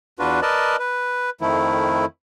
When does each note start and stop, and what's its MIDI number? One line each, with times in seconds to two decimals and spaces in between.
0.19 0.40 40
0.19 0.40 62
0.19 0.40 65
0.19 0.40 66
0.19 0.40 71
0.42 0.76 70
0.42 0.76 71
0.42 0.76 74
0.42 0.76 75
0.42 0.76 81
0.79 1.30 71
1.41 2.05 41
1.41 2.05 51
1.41 2.05 53
1.41 2.05 57
1.41 2.05 64